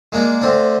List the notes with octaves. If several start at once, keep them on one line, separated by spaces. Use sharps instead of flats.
G#3 A#3 D4
D2 C4 D4